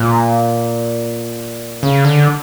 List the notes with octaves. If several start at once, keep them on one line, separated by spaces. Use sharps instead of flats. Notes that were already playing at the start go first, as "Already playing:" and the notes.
Already playing: A#2
C#3
D3